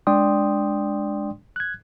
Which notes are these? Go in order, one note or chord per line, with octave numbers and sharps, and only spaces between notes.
G#3 D4 D5 G5 C6 D#6
F#6 G#6